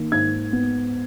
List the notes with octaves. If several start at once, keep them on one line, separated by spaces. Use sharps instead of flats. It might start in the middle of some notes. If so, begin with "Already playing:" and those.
Already playing: D#3 A#3
G#2 G#6
B3